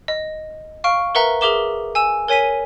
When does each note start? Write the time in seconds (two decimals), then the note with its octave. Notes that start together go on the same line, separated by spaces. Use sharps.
0.08 D#5
0.84 F5 C#6 F6 D7
1.15 A#4 B4 E5 F#5 A#5
1.41 G#4 A#4 E5 D6 E7 G7
1.95 G#5 E6 E7
2.28 A#4 C#5 G#5 B6 D#7